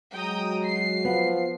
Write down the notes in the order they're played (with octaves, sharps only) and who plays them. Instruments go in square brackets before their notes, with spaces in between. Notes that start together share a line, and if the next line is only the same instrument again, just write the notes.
[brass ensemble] F#3 F#4 [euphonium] G#3 [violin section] G5 A#5 D#6
[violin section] C7
[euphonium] F3 [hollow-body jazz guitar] B3